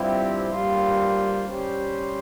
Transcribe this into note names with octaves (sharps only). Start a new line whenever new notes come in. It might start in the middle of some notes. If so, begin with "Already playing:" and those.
Already playing: G2 F3 C4 E4 G4
G2 G3 A#3 F4 C5
G3 C#4 G4 C5